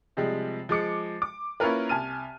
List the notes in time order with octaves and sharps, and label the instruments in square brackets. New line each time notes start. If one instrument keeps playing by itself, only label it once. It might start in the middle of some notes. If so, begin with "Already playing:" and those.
[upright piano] C3 F3 G3 G#3
F3 G#3 D6 C#7
D6
A#3 C#4 E4 F4 A#4 B4
C2 G#5 A5 F6 D#7